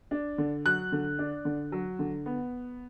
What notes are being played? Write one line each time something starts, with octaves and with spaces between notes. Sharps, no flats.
D4
D3
F#3 F#6
D3
D4
D3
F#3
D3
B3